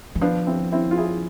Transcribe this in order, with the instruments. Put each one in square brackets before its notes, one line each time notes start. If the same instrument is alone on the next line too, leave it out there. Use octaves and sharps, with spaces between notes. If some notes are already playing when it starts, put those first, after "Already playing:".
[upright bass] E3
[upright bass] F3 [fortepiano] B3 D4
[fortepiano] C4 E4
C4 E4
F4
E4 G#4